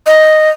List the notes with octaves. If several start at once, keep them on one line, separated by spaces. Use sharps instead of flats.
D#5